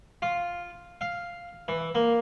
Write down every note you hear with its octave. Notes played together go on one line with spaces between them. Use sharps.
F4
F5
E3
A#3